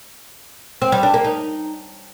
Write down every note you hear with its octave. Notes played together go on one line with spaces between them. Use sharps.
C4
G3
D4
A#3
D#4